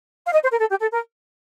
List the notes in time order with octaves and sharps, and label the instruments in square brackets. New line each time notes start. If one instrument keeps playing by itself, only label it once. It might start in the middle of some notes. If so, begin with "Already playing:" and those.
[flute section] F5
D#5
C5
A#4
A4
G4
A4
A#4